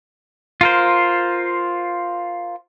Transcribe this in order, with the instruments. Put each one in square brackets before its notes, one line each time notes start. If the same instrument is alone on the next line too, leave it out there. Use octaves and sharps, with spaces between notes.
[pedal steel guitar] F4 A#4 C5